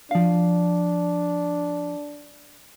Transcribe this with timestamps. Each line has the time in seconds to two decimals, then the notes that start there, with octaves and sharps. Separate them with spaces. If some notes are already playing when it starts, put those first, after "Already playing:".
0.11 F3 D4 F5